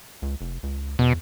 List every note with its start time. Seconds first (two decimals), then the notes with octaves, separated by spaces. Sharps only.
0.22 C#2
0.41 F1
0.63 C#2
0.99 E2 B2